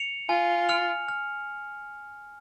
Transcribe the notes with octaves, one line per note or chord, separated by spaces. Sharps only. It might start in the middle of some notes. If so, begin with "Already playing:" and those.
Already playing: C#7 F7
F4 G#5
F6 C#7 F7
F6